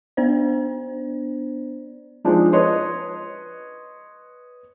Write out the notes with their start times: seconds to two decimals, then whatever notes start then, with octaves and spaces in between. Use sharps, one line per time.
0.17 B3 D4 C5 D5
2.25 F3 G#3 D4 D#4
2.53 B4 C#5 D#5 C6